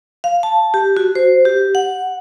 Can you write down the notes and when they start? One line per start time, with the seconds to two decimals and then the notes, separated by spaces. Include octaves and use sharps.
0.24 F5
0.43 A5
0.74 G4
0.97 F#4
1.15 C5
1.45 G4
1.75 F#5